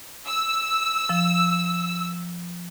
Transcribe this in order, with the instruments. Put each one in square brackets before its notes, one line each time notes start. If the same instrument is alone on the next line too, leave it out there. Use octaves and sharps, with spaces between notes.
[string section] E6
[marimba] F3